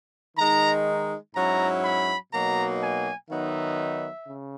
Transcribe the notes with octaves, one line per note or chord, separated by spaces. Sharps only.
D#3 G#3 D#4 A#5
G#2 F#3 C#4 E4 A#5
B5
B2 F#3 A#3 D#4 A#5
G#5
D#3 F#3 B3 D#4 E5
C#3